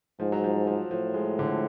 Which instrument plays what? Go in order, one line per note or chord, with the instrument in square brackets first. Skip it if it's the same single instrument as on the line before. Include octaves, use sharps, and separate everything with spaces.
[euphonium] G#2 [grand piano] F3
[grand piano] F#3
F3
F3
[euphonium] A2 [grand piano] F3
[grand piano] G#3
D3
F3